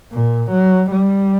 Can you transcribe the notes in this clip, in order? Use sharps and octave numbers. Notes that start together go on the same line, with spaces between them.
A#2
F#3
G3